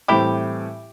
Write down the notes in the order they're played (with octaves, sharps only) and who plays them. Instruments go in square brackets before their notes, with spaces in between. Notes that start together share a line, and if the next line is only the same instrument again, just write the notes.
[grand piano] A2 E3 G3 C4 [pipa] E4 G4